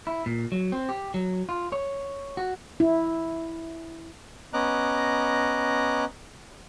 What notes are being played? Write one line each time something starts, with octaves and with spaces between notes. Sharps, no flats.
E4
A#2
F#3
C4
G4
F#3
F4
C#5
F#4
E4
B3 C#4 D#5 A#5 D6 F#6